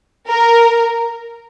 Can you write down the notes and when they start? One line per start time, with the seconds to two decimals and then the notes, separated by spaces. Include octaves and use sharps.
0.28 A#4